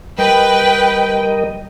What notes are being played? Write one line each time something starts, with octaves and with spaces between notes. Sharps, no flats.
G3 A#4 B4 D#5 G5